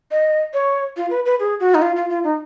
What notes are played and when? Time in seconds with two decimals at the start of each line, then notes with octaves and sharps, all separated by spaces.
0.11 D#5
0.53 C#5
0.97 F4
1.10 B4
1.25 B4
1.40 G#4
1.60 F#4
1.74 D#4
1.82 F4
1.96 F4
2.09 F4
2.24 D#4